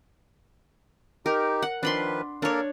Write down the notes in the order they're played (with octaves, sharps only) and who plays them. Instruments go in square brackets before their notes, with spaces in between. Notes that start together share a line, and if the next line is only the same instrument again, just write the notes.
[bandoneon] D#4 G4 [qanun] A#4
[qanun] F#5
[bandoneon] D#3 F3 B4 [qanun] D4 B5 C6
[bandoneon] A#3 A4 A#4 [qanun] D4 C#5